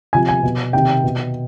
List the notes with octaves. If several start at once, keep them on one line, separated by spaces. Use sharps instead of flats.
C3 F3 G#5
G#5
B2
C3 D#3 G5
B2